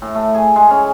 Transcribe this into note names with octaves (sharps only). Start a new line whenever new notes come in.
A2
A3
G#4
G#3
C#4